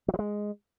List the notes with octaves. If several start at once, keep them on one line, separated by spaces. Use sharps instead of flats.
F#3
F3
G#3